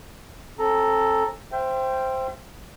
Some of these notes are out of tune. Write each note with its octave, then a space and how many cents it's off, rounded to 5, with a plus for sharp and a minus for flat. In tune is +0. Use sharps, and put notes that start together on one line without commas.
C4 +40 A4 +0 A#5 +0
C5 +0 E5 +40 G5 +0